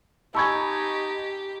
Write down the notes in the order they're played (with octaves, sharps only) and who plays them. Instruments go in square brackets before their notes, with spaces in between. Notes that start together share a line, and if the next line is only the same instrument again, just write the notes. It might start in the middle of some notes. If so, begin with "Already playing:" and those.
[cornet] D#4 [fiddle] G4 [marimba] G#5 B5 E6 [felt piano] A5 C#6 G#6